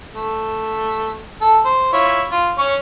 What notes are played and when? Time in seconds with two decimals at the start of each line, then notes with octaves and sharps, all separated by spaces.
0.15 A3
1.41 A4
1.65 C5
1.93 E4 F4 C#5
2.32 F4
2.58 C#4 C#5